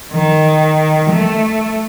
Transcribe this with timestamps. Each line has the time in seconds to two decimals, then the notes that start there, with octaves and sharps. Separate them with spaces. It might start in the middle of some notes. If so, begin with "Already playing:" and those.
0.13 D#3
1.10 A3